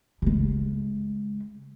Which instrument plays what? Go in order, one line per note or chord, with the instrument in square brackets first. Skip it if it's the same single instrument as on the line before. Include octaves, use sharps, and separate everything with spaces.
[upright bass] C#3 G#3